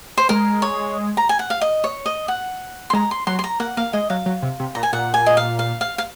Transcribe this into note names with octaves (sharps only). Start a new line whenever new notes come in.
C5
G#3 A#4
C#5
A#5
G#5
F#5
F5
D#5
C#5
D#5
F#5
C6
G#3 A#5
C6
F#3 C6
C6
A#5
A#3 F#5
A#3 F5
G#3 D#5
F#3 F5
F#3
C3
C3
A#2 A#5
G#5
A#2 F#5
G#5
D#5
F5
F5
F5
F5